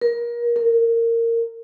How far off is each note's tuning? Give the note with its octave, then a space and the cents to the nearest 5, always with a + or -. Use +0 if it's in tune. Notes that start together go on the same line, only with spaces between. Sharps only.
A#4 +30
A#4 -20